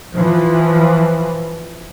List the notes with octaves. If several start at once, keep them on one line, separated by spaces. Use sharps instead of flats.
E3 F3